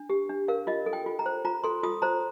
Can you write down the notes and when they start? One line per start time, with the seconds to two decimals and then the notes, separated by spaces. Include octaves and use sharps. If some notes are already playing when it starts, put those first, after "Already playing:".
Already playing: D4
0.10 G4
0.29 D4
0.48 A#4 F5
0.67 F4 D#5
0.86 A4
0.93 G5
1.06 F4
1.19 A#5
1.26 C5
1.45 F4 A#5
1.64 A4 C6
1.83 F4 D#6
2.02 C5 A#5